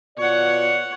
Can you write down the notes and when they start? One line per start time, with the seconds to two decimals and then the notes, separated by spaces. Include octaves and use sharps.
0.18 B2 F4 C#5 D5 F#5